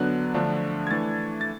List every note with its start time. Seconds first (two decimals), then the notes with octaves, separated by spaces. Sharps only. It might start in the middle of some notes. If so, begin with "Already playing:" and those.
Already playing: D3 F#3 B3 D4 F#6
0.34 D3 F3 A3 D4
0.87 G#6
0.91 E3 A3 D4 A6
1.41 A6